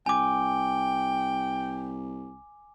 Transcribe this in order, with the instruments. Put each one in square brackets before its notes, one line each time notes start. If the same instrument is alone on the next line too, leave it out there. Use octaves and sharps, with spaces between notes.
[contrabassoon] C2 [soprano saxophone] G5 [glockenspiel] G#5 D6